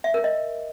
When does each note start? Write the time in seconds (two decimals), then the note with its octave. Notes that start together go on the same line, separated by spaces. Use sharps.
0.04 E5
0.14 A#4
0.24 D#5